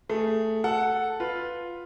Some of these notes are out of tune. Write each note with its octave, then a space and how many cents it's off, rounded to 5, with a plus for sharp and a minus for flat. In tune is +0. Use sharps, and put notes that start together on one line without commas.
A3 +0 G#4 +0
A4 +0 F#5 +0
F4 +0 B4 +0